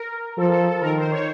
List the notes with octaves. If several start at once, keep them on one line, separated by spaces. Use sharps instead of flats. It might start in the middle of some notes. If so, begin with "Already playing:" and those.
Already playing: A#4
F3 A4
A4
A4
D#3 A#4
C5
C#5